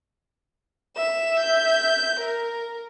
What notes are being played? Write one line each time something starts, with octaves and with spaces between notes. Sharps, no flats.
E5 E7
G6
A#4